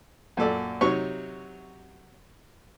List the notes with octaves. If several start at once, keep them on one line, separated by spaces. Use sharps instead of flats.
F#2 A#2 A4 D5
C3 F#3 D#4 C#5 C#6